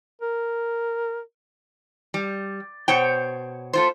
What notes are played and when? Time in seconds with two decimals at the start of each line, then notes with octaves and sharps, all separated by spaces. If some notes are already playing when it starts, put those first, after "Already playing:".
0.22 A#4
2.14 G3
2.88 B2 C5 C#5 G5
3.73 A3 F4 C5